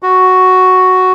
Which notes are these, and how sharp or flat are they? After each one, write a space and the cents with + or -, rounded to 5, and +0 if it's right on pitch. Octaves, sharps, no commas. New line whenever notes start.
F#4 +0